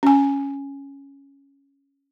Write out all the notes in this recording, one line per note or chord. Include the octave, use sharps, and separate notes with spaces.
C#4 G#5